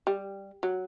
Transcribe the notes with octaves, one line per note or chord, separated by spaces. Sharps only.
G3
F#3